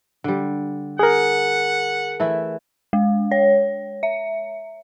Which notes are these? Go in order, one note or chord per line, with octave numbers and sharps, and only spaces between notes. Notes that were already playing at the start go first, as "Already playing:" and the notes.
D3 G3
G#4 A#4 F#5
E3 A3 E4
G#3
C#5
E5